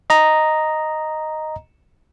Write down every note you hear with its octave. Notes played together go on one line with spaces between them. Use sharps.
D#5 A#5